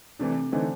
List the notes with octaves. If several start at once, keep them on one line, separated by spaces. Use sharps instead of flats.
C3 E3 A3 D4
D3 E3 A3 C4 D#4